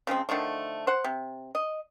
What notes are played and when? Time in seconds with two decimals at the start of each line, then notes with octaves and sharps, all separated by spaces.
0.07 C#3 F3 G#3 C4
0.29 D3 D#3 F3 A3
0.87 C5 F#5
1.04 C3
1.55 D#5